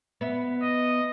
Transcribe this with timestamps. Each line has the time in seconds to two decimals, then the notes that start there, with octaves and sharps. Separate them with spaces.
0.21 B3 E5
0.63 D#5